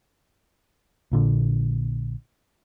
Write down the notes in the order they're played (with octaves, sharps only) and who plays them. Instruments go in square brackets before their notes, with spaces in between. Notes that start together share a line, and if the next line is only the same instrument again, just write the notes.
[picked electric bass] A#1 A#2 D3